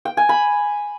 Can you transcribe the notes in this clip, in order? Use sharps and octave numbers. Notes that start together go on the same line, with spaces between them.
G5
G#5
B5